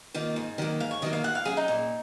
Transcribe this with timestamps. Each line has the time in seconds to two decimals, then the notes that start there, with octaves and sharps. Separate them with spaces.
0.14 D#3 A#3 F4
0.36 G#2
0.58 D#3 F#3 A#3
0.80 G#2 F5
0.91 C#5
1.02 D#3 F#3 A#3 D#5
1.13 F5
1.24 A#2 F#5
1.35 F5
1.45 F#3 C#4 G#4
1.57 D#4
1.68 A#2